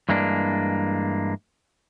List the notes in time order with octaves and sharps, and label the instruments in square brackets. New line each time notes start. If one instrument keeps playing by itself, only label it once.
[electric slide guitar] G2 E3 G#3 A#3 D4